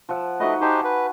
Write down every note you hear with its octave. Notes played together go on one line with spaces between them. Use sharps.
F3 E5 F#5
A3 D#4 F#4 B4 D#5
D#4 G4 C5 E5 G#5 A5
B4